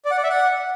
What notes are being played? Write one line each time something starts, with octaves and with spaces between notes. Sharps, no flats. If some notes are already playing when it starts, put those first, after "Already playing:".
D5
F#5
D5
E5
F#5